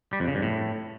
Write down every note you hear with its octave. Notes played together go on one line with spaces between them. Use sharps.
G3
F2
C#3
G2
A2